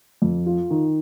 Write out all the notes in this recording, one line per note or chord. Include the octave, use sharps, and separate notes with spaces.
F2
F4
D#3